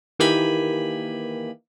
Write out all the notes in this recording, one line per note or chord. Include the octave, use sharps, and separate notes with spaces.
D#3 E3 A#3 G4 G#5 B5